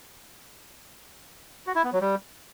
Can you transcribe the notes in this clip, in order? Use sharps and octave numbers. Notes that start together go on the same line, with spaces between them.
F#4
E4
B3
F#3
G3